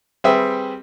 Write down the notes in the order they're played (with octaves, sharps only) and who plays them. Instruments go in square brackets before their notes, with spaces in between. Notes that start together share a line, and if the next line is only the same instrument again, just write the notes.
[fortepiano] G3 C4 G4 G#4 B4 E5